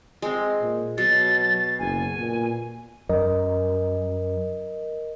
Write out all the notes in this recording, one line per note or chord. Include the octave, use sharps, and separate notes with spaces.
G#3 C4
A#2
B2 F#3 A6
F#1 G#5
A#2
F#2 A#4 D#5